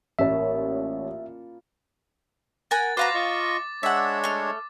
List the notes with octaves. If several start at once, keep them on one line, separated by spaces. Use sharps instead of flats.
A1 A#2 C#5 E5 A5 B5
A#4 F#5 G#5 A6
F#4 B4 C5 F5 A#5 D6
F4 D#5 C#6
G#3 D4 C#5 E5 F#5
A3 F6